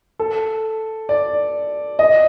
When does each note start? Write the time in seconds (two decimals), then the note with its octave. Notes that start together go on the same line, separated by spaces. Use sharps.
0.19 A4
1.09 D5
1.99 D#5